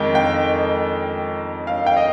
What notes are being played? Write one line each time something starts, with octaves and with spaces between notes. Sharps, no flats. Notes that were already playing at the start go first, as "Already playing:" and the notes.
Already playing: F2 D#3 G#3 G5
G5
F5
G5
D#5